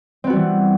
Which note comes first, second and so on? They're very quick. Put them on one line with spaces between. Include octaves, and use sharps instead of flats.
C4 B3 F#4 G3 E3